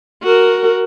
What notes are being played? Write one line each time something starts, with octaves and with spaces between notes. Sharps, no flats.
F#4 A#4